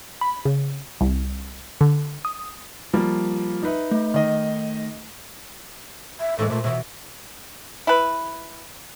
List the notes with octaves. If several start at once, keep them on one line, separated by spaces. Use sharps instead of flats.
B5
C#3
C2
D3
D#6
F3 G3 A#3
D#4 B4 E5
A3
D#3 D#5
E5
A2 E3 G#3 A4
A#2 A3
B2 E3 E5
E4 B4